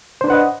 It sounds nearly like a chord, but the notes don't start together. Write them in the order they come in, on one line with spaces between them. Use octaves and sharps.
C5 D4 B4 F#5 D#5